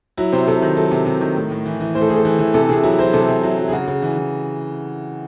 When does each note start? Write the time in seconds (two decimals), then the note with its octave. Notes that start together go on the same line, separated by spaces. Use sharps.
0.17 F#3 E4
0.32 C3 C5
0.47 C3 A4
0.62 D#3
0.77 F#3 A4
0.91 C3
1.06 C3
1.21 D#3
1.36 A2
1.51 A2
1.66 E3
1.80 E3
1.95 A2 C5
2.02 A4
2.09 A2 G#4
2.16 A4
2.25 E3
2.39 E3
2.54 C3 A4
2.69 C3 G#4
2.83 F#3 E4
2.99 F#3 C5
3.13 C3 A4
3.28 C3
3.43 F#3
3.58 F#3
3.68 G#4
3.72 C#3 F#4
3.87 C#3
4.02 E3
4.17 E3